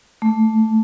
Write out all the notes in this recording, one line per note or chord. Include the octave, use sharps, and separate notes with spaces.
A3